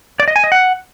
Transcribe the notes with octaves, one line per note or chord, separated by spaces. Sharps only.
D5
D#5
G#5
D#5
F#5